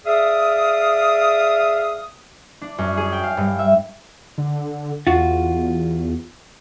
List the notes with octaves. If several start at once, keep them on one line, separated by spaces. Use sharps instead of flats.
G#4 D5 E5 F5 D#6
D4
F#2
G#4
G5
F5
G2
E5
D3
E2 F4 F#4